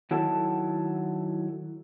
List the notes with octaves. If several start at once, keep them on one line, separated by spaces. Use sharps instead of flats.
D#3 F#3 E4 A4 F#5 A5